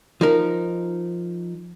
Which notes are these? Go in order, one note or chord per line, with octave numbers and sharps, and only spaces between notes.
F3 D#4 A#4